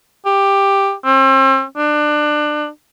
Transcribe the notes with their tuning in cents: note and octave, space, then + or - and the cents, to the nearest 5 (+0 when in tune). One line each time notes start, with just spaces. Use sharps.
G4 +10
C4 +40
D4 +25